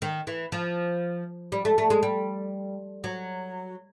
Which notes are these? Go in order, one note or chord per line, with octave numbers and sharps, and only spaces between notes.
D#3
E3
F3
G3
A3
A3
G#3
G3
F#3